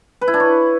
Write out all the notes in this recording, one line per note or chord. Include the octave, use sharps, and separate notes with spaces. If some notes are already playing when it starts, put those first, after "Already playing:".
B4
E4
D4
C#5